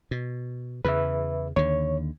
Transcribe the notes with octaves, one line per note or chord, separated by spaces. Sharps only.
B2
E2 C#3 B4 E5
D#2 D3 C#5